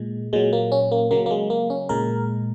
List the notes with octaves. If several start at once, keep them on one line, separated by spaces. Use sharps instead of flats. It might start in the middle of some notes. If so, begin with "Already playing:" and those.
Already playing: A#2 G#3
A#2 F#3 G#3
A#3
C#4
A#3
C#3 F#3 A#3
A#3
G#3
A#3
C#4
A#2 G#3 A#4